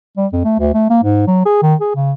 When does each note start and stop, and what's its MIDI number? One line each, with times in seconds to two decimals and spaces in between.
0.17 0.26 55
0.32 0.40 41
0.44 0.54 57
0.59 0.73 38
0.74 0.89 57
0.90 0.99 58
1.03 1.26 44
1.27 1.44 54
1.45 1.61 68
1.62 1.75 51
1.81 1.95 68
1.95 2.13 49